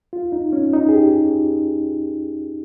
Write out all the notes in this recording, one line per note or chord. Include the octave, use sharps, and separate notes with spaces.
F4
D#4
C#4
D#4
G#4
G4